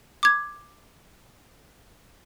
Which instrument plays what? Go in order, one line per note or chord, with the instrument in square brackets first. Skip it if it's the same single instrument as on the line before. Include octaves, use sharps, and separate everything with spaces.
[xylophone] D6 G#6